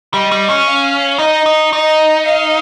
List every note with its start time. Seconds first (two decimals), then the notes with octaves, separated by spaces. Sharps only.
0.14 G3 D#5
0.32 G3
0.49 C#4
0.66 F5
1.19 D#4 D#5
1.46 D#4
1.72 D#4 D#5
2.25 F5